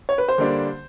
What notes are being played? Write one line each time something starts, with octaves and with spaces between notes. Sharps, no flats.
C#5
B4
C5
D3 G3 A#3 D4